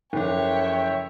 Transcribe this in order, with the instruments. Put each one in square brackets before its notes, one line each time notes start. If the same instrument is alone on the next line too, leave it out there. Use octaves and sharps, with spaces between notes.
[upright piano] F#1 [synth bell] F3 A4 [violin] C#5 [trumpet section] E5 G5